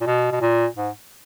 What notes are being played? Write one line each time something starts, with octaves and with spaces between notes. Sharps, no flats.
A#2
B2
B2
A#2
G#2